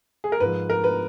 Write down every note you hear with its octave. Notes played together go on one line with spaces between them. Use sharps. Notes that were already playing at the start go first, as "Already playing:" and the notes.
G#4
A#4
G#2 F3 B4
A#4
B4